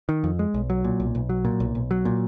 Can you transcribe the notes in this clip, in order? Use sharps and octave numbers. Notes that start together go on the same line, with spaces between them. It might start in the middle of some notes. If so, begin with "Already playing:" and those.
D#3
F2
G#3
B1
F#3
A#2
B1
B1
F#3
A#2
B1
B1
F#3
A#2